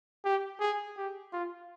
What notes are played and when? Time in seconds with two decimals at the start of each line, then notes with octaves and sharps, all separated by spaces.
0.25 G4
0.60 G#4
0.97 G4
1.33 F4